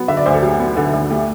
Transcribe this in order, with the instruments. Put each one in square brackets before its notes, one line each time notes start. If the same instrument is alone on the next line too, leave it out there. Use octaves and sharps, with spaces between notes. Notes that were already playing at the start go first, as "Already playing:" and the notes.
Already playing: [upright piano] F#3 B3
D3 E5
D5
D2 C5
A4
F#3 G4
B3
D3 A4
D2
A3 G4